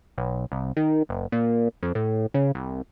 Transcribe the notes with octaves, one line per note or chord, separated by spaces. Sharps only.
B1
C2
D#3
F#1
A#2
F2
A2
C#3
C2